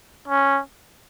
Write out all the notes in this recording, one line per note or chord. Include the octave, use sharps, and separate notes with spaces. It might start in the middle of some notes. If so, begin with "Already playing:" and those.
C#4